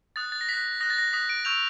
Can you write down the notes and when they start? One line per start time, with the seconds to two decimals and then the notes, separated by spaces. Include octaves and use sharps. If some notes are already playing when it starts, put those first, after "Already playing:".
0.16 D#6 F#6 A6
0.32 A6
0.41 A#6
0.49 D#6 F#6 B6
0.80 D#6 F#6 A#6
0.90 A6
0.98 A#6
1.13 D#6 F#6 B6
1.29 D7
1.45 C#6 E6 G6 F7